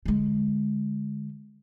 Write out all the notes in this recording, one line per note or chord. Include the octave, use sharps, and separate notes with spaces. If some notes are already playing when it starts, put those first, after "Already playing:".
D3 G#3